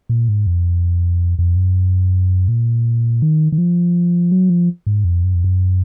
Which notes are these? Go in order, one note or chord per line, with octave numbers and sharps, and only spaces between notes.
A#2
G#2
F2
F2
F#2
A#2
D#3
D#3
F3
F#3
F3
G#2
F2
F#2
F2
F#2